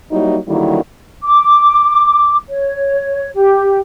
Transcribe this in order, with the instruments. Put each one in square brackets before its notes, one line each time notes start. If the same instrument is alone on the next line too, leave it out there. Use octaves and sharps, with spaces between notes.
[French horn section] F#3 G3 A#3 D#4 E4
D3 D#3 F#3 G3 A#3 E4
[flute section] D6
C#5
G4